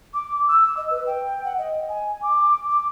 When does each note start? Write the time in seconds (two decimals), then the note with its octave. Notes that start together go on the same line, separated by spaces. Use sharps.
0.14 D6
0.48 E6
0.77 D#5
0.91 B4
1.07 G5
1.45 F#5
1.58 D#5
1.89 G#5
2.22 D6
2.69 D6